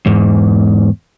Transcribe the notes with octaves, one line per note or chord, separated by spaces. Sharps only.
E2 G#2